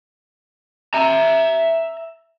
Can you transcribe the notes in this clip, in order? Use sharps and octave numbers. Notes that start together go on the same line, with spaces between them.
E5 A#5